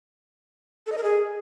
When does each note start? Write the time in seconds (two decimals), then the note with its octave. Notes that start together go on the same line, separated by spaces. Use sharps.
0.87 A4
0.92 D#5
0.98 A#4
1.03 G#4